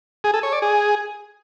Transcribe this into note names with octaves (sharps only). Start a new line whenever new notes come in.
G#4
A4
C#5
D5
G#4